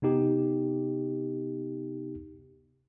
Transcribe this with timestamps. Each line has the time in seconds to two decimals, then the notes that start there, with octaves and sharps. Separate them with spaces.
0.02 C3 B3 D#4 G4